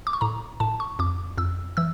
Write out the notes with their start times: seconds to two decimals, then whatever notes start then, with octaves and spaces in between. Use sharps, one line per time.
0.07 D6
0.13 C#6
0.21 A2 A#5
0.60 A2 A5
0.80 C#6
0.99 F2 D6
1.38 F2 E6
1.77 E3 E6